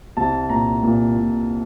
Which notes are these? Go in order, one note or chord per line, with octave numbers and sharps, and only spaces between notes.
C2 A5
A#2 A#5
A#2
A#2